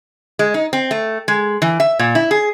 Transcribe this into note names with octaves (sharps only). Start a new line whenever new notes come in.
G#3
D#4
C4
A3
G#3
E3
E5
A#2
E4
G#4